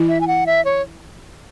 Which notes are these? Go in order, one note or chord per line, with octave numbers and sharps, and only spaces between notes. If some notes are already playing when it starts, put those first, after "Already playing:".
Already playing: E3 E4
E5
G#5
F#5
E5
C#5